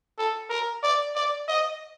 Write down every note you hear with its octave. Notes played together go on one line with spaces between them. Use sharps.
A4
A#4
D5
D5
D#5